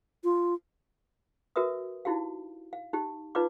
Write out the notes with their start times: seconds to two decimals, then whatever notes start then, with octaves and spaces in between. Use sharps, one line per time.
0.24 F4
1.56 F#4 A#4 B4 E5 D#6
2.05 D#4 E4 F#4 G4 F5
2.73 F5
2.93 D#4 G4
3.35 D#4 F4 B4 D5 F5 D6